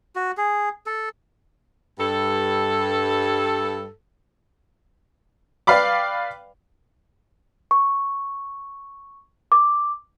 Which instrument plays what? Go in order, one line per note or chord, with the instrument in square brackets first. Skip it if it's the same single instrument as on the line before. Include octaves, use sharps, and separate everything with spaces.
[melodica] F#4
G#4
A4
[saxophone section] G2 A4
[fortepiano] B4 D5 F5 G5 B5 D6
[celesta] C#6
D6